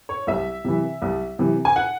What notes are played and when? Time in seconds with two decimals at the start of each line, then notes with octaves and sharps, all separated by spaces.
0.09 C#5
0.27 C2 E5
0.65 C3 E3
1.02 C2
1.39 C3 E3
1.65 G#5
1.76 F#5